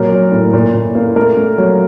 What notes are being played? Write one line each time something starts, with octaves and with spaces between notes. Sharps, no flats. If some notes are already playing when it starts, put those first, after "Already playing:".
Already playing: A#2 F#3 A#4
F#3
A2
A#2
A#2
A#3
A3 A#4
A3
F#3